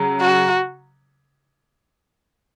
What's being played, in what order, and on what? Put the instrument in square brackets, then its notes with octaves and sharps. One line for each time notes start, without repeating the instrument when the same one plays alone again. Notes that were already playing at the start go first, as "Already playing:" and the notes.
Already playing: [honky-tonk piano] C#3 F#3
[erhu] F#4